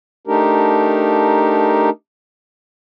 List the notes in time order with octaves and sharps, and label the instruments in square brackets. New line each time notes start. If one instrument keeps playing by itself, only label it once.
[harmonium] A3 D4 D#4 G4 A#4